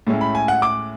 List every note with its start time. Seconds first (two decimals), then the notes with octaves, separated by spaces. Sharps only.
0.07 A2 G#3 C#4 E4
0.21 B5
0.35 G#5
0.48 F#5
0.62 D6